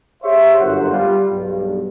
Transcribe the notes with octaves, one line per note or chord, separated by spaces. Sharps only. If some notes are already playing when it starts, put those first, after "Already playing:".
G4 G#4 C5 C#5 E5
G1 F#2 C5 F#5
G3 F4
B1 G2